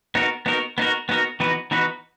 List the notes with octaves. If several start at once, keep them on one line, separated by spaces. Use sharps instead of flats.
B3 D#4 F#4 A#4
B3 D#4 F#4 A#4
B3 D#4 F#4 A#4
B3 D#4 F#4 A#4
E3 B3 D#4 F#4 B4
E3 B3 D#4 F#4 B4